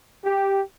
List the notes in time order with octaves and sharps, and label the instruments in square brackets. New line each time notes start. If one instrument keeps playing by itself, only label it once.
[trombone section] G4